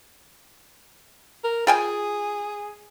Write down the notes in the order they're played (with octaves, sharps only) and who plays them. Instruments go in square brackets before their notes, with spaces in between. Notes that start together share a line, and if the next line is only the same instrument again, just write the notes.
[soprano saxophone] A#4
[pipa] F4 G5 G#5 [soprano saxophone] G#4